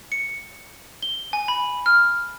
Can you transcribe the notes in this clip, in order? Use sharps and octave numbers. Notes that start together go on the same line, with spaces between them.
C#7
G7
G#5
B5
F6